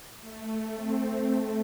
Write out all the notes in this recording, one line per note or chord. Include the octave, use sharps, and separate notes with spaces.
A3
C4
A3